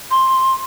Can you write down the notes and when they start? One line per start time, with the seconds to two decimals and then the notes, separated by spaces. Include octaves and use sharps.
0.11 C6